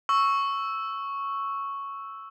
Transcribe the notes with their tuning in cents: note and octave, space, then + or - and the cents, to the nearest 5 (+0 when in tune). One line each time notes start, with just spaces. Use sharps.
C#6 +0 E6 +0